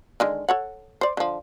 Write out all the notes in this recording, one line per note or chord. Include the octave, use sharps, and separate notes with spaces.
D3 D#3 G#3
A4 C#5 F#5
C5 D5
D3 F3